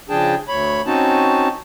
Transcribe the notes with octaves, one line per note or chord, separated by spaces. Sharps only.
C#3 F3 D4 G#4 G5 A5
D2 C#5 B5
C4 C#4 D#4 F#4 A5